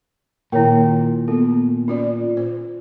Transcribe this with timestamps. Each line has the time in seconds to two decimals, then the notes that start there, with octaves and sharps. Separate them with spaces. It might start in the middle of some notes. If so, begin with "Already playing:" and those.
0.52 A#2 D#3 A#3 E4 A#4 C#5 G5
1.28 B3 A4
1.88 C#4 F4 D5
2.37 C5